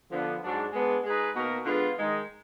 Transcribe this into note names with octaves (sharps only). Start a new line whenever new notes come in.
D3 F3 B3
G#2 F#3 D4
G#3 B3 D4
G#3 D#4 G#4 B4
B2 A#3 D#4 F#4 A#4
D3 G#3 B3 F4
D#3 G#3 D#4